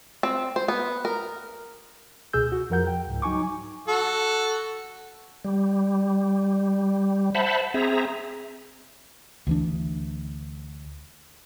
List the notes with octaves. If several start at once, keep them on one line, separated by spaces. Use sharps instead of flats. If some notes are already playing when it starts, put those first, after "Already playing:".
C4
C5
B3
A#4
C#2 B2 G#4 E6 G6
F#4
F2 F3 A#4 F#5 G6
G5
C#2 G#2
F#3 D#4 G#5 C#6 D6
F#4 A4
G3
C5 E5 F#5 A5 B5
C4 G#4 E5 A#5
D2 E3 D4